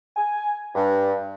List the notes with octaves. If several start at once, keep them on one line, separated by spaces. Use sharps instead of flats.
G#5
G2